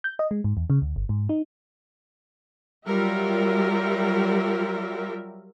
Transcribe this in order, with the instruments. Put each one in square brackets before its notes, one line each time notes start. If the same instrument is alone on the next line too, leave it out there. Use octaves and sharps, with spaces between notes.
[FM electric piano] G6
D#5
G#3
G#2
E2
C#3
D2
G1
G#2
D#4
[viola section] F#3 G3 F4 G4 A#4 E5